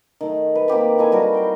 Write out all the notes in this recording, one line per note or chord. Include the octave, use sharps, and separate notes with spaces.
D#3 A3
B4
A#3 C4 G4 B4
D#4 E4 A4 G#5
G3 F#4 A#4
G5 C6